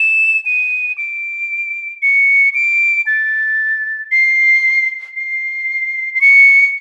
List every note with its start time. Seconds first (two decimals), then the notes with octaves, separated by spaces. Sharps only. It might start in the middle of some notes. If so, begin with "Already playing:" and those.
Already playing: E7
0.46 D#7
0.98 D7
2.02 C#7
2.55 D7
3.06 A6
4.11 C7
5.16 C7
6.14 C7
6.21 C#7